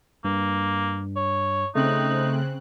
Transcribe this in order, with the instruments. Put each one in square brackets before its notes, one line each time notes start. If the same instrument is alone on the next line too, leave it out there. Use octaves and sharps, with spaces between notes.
[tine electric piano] G2 [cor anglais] A#3
[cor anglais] C#5
[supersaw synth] C#3 C4 F#6 [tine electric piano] A3 [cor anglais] D#4